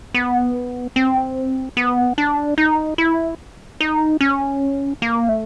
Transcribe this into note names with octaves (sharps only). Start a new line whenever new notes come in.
B3
C4
B3
D4
D#4
E4
D#4
C#4
A#3
A3